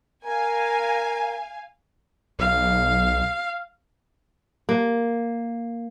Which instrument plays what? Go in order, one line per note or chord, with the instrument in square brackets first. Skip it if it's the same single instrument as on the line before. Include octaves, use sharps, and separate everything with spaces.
[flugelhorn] A#4 [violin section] F5 G#5
[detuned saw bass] B1 [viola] F5
[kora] A#3